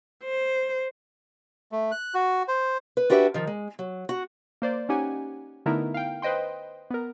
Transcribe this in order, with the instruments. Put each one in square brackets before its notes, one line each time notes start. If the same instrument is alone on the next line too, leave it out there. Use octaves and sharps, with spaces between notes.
[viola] C5
[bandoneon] A3
F#6
F#4
C5
[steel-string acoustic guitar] B4
D4 F#4 G4 B4 C5 E5
D#3 F3
G#3
F#3
F#4
[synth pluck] A#3 C5 D5
C#4 D#4 G4 F#5 G#5
D3 A3 B3 D#4 E4 A#4
F5 G5
B4 C5 D#5 G5 C6
B3 A#4